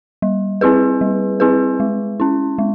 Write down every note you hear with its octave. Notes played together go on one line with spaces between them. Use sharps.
G3
C4 E4 G#4 B4
G3
C4 E4 G#4 B4
G#3
C#4 E4
G#3